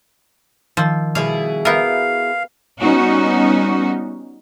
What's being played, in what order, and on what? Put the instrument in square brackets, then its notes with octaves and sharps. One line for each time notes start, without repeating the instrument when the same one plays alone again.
[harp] D#3 E6 [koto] F3
[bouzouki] B2 E4 G#4 [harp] G3 [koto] F5
[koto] B3 A#4 [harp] E5 G#5 G6 [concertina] F5
[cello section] G3 B3 C#4 D#4 F#4